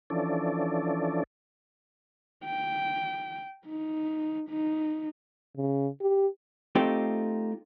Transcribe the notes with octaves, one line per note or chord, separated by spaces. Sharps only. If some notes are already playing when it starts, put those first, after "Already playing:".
E3 F3 C#4 D4 A4 D5
G5
D#4
D#4
C#3
G4
A3 C4 D#4 F4 G4